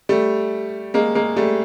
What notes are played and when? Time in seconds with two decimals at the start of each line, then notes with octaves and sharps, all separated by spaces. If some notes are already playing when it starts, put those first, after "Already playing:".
0.09 G3 A3
0.94 G#3 A#3
1.15 G#3 A#3
1.36 G3 A3